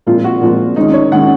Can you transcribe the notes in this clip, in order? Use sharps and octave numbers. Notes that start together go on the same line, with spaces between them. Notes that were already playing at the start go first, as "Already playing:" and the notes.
A#2 F3 G#3 C4 F4
F#4
A#2 F3 G#3 C4
D#3 G#3 C#4 D#4
C#5
D#3 G#3 C#4 F#5